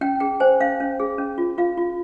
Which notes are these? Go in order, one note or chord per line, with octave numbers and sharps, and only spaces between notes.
C#4 G5
G#4 G5
C5 G#5
C#4 F5
C#4
G#4
C#4
F4
F4 F5
F4